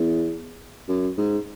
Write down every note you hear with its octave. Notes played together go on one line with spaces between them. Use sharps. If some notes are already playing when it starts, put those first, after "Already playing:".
Already playing: E2
F#2
G#2